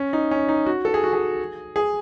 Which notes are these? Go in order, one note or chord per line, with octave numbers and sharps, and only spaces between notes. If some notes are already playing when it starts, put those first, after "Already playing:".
Already playing: C#4
D#4
C#4
D#4
F#4
A4
G#4
F#4
G#4
G#4